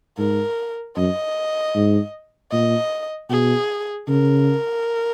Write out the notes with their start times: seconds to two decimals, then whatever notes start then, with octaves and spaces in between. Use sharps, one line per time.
0.18 G#2 A#4
0.96 F#2 D#5
1.75 G#2
2.52 A#2 D#5
3.30 B2 G#4
4.08 C#3 A#4